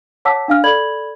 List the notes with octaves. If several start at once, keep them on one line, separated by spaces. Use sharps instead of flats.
C#5 F#5 A5 D6 E6 B6
D4 F5 F6
A4 D5 B5 G#6 F#7